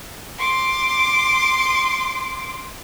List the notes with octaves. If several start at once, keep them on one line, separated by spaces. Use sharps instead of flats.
C6 D6